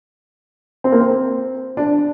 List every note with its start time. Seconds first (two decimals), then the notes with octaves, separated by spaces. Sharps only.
0.84 C4
0.92 A#3
1.00 C4
1.77 D4